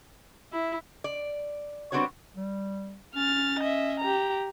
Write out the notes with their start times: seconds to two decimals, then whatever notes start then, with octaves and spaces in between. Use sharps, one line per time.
0.53 E4
1.04 D5
1.92 G3 B3 C4 D4 F#4 C#5
2.35 G3
3.15 C#4 F6 A6
3.60 D#5 E5
4.00 G4 A#5